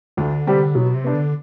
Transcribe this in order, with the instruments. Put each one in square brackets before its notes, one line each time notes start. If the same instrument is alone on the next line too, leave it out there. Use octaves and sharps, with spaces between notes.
[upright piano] D2 [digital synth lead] D3
[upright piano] C3 G3 C4 G4
[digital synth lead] B2 [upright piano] F#3
[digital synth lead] C3
[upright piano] B3 D4
[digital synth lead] D3